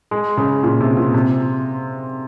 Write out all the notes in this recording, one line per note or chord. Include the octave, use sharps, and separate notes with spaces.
G#3
C#3
A#2
C3
A#2
C3